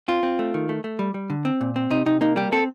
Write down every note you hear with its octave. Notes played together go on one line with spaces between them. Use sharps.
C4 F4
C4
A3
D#3
A3
A3
G3
G3
D3
C4
A#2
C4
C3 D#4
C3 D#4
A#3 D#4
G3 G4
C4 A4